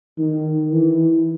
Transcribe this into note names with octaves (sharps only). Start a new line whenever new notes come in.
D#3
E3